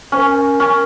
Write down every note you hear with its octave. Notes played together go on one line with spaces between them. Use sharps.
C#4 C5
A#4
C#4